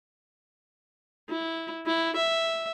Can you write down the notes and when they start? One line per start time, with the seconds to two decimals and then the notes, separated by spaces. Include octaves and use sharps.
1.30 E4
1.86 E4
2.16 E5